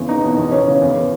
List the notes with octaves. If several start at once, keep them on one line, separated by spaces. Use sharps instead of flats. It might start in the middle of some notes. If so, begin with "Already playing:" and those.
Already playing: E2 C#3
D#4
B2
E2
C#4
C#3
E2